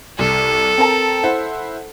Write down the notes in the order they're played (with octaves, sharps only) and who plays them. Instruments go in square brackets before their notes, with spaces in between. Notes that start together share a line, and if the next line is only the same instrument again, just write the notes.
[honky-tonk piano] C2 [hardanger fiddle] A4
[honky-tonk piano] C4 A#4 A5
E4 C5 F#5